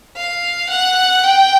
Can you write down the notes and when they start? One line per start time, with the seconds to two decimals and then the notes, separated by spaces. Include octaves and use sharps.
0.16 F5
0.70 F#5
1.24 G5